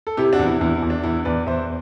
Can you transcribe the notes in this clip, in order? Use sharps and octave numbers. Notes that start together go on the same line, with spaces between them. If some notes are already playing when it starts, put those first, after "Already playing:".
A4
C3 E4 G4
D4 F#4
E2
E4
E2 E4
E4
E2
D4
E2 E4
E2 B4 D5
E2 C5 E5